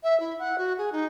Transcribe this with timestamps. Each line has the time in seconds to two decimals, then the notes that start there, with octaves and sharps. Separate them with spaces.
0.03 E5
0.20 E4
0.39 F#5
0.58 F#4
0.78 G#4
0.92 D#4